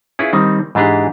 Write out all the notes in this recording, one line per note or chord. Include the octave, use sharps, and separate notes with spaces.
C#4 E4 F4 G#4 B4
D#3 G3 C4 D#4
G#2 E3 D4 G4 G#4